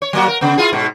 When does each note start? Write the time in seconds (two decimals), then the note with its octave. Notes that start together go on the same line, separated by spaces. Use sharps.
0.02 C#5
0.13 F#3 A#3 F#4
0.28 A#4
0.41 C#3 B3
0.58 E4 F4 G#4
0.73 G#2 B2